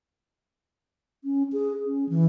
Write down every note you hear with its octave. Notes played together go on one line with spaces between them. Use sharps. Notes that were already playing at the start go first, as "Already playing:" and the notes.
C#4
G#4
C#4
E3